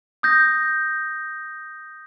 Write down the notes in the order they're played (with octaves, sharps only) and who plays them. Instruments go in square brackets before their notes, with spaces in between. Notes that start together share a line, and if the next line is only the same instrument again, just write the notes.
[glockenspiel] D#6 G6 A#6